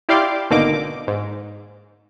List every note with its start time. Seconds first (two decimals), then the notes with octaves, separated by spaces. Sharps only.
0.09 E4 G4 D5 F5 C6 D6
0.50 G#1 B2 D3 A#3 D#4 D6
1.07 G#2